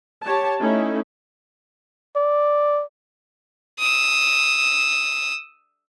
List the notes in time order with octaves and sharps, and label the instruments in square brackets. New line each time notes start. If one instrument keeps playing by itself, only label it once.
[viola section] G4 C#5 A5
A3 C#4 D#4 E4
[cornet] D5
[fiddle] D#6 E6